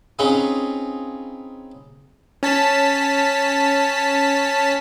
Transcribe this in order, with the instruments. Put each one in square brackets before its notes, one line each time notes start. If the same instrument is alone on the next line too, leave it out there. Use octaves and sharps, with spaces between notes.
[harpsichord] C4 C#4 D#4 F4 G#4 B4
[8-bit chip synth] C#4 A5 B6